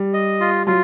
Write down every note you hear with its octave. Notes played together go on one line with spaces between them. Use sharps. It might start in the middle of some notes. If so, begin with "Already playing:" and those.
Already playing: G3
D#5
F4
F#3 F4